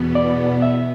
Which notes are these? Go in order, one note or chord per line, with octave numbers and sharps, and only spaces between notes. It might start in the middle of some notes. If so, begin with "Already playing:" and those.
Already playing: E2 B2 B3
D5
E5